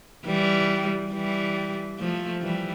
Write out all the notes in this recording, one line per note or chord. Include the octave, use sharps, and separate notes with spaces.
E3 G3
E3 G3
F3 A3
E3 G3